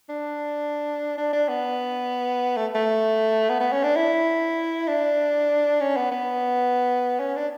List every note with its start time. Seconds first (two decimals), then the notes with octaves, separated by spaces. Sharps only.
0.09 D4
1.17 D4
1.32 D4
1.48 B3
2.56 A3
2.75 A3
3.49 B3
3.60 B3
3.72 C#4
3.84 D4
3.96 E4
4.88 D4
5.80 C#4
5.97 B3
6.11 B3
7.20 C#4
7.35 D4